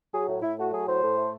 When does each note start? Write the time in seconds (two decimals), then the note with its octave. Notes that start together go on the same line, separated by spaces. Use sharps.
0.13 F#3 G#4
0.28 A2
0.42 A2 E4
0.58 A3 F#4
0.72 F#3 G#4
0.87 A2 C5
1.03 A2
1.17 A3